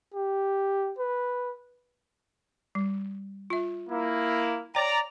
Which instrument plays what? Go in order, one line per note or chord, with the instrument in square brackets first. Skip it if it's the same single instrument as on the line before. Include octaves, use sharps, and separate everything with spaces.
[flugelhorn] G4
B4
[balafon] G3
F4 E5
[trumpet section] A#3 E4
[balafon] C#5 G5 [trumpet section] D5 A#5